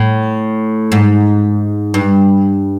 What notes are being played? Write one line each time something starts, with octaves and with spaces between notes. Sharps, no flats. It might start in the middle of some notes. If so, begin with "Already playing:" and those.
Already playing: A2
G#2
G2